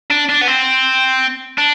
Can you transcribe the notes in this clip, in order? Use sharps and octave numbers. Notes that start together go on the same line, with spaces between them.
D4
D4
B3
C4
D4